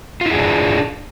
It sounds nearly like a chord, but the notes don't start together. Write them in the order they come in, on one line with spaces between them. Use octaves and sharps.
F4 E4 G#4 D4